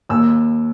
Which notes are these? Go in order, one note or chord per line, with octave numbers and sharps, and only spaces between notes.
D#2 E6